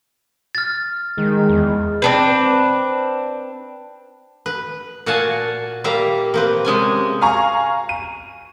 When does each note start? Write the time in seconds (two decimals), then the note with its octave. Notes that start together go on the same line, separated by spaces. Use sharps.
0.55 F6 A6
1.18 D#3 G#3
1.49 E2
2.02 C4 D4 B4
4.46 B4
5.06 A#2 F#4 F5 F#5 G#5 A5
5.84 G3 A#3 E5 F5 A#5
6.34 A#3 C4 B4
6.65 C3 G#3 C#4 G#5
7.21 F5 G#5 A#5 C#6
7.89 D#7